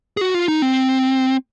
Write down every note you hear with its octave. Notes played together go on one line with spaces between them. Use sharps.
G#4
F#4
F4
D#4
C4